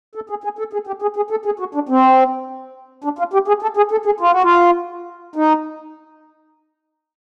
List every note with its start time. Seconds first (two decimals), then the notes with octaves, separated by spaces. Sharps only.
0.15 A4
0.30 G#4
0.44 G#4
0.59 A4
0.73 G#4
0.87 G4
1.02 G#4
1.16 G#4
1.30 A4
1.45 G#4
1.59 F#4
1.75 D4
1.89 C4
3.04 D4
3.19 F4
3.33 G4
3.48 G#4
3.62 A4
3.77 G#4
3.91 A4
4.06 G#4
4.20 F4
4.31 F#4
4.43 F4
5.36 D#4